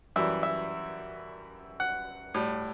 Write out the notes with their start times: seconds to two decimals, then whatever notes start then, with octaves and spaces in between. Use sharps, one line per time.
0.16 F#2 E3 G3 E5
0.43 E5
1.80 F#5
2.34 A2 G3